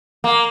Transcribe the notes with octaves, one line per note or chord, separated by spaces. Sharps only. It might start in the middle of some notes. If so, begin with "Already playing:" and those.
A#3